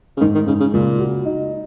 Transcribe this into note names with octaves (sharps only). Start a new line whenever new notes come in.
C#3
G#2 D#3
D#3
G#2 C#3
C#3
C#2 A#2
F#4
D#4